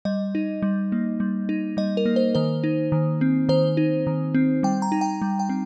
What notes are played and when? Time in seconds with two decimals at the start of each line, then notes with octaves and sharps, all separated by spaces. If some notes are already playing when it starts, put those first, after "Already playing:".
0.05 G3 D#5
0.35 D#4
0.62 G3
0.92 A#3
1.20 G3
1.49 D#4
1.77 G3 D#5
1.97 A#4
2.06 A#3
2.16 C5
2.35 D#3 C5
2.64 D#4
2.92 D#3
3.21 C4
3.49 D#3 C5
3.77 D#4
4.07 D#3
4.34 C4
4.63 G3 G5
4.82 A#5
4.92 D#4
5.01 G5
5.22 G3
5.39 G5
5.49 C4